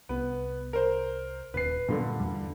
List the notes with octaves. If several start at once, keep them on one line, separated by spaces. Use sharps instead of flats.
C2 B3
A#4 C5
D#1 B4 C7
G2 A#2 D3 G3
E2 G3